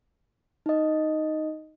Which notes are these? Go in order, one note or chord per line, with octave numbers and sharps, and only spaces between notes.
D#4 D#5